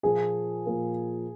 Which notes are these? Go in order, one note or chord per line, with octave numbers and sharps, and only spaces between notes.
A#2 F3 A#3 G#4
A#2 F3 A#3